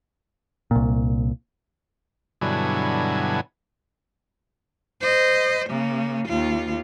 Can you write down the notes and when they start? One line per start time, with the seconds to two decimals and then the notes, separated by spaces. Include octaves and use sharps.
0.71 C2 A#2
2.41 G2 B2 D3 F#3 E4 G#5
5.01 C5 D#5
5.70 C#3 A#3
6.28 D#2 F4